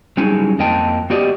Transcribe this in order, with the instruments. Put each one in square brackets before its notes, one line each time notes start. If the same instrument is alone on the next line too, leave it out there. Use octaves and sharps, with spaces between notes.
[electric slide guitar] F#3 G3 C#4 D#4 E4 G#4
F2 A#3 D#5 G5 A5
B3 F#4 G4 D5 D#5